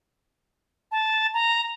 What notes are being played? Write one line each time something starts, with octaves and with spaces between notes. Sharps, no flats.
A5
A#5